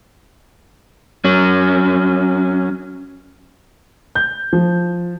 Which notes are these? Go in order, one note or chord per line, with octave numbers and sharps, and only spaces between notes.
F#3 C#4
G6
F3